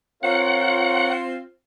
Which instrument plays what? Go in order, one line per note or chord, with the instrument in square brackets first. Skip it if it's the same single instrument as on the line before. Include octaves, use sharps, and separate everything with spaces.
[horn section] C4 F4 [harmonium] A#4 C#5 F5 [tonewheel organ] F#5